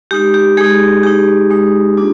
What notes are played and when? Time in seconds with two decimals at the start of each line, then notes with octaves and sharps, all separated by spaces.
0.11 G#3 D#4 G4
0.34 G4
0.57 G#3 D#4 G#4
1.03 G#3 D#4 G4
1.50 G#3 D#4
1.97 A#3 D4 F4